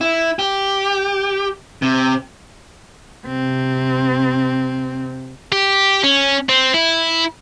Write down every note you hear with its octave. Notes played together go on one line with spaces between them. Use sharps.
E4
G4
C3
C3 C4
G4
C#4
C4
E4